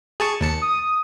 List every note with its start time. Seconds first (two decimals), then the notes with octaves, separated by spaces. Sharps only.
0.20 G#4 A5 C#6
0.41 D#2 A5 C#7
0.62 D#6